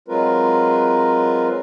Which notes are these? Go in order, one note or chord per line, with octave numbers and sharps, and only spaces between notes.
F#3 G#3 C4 F4 A#4 B4